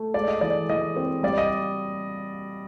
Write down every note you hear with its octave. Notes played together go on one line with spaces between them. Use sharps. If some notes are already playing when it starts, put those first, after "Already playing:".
Already playing: A3
G#3 D5
D#5
E3 D5
E3 D#5
C4
G3 D5
D#5